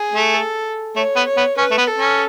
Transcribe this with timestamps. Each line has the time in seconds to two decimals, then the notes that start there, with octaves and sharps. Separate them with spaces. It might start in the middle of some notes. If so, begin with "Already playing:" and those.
Already playing: G#4
0.14 A3
0.34 A4
0.96 A3 C#5
1.16 B3
1.26 C#5
1.37 B3
1.57 C#4 B4
1.71 A3
1.78 B3
1.88 A4
1.98 C#4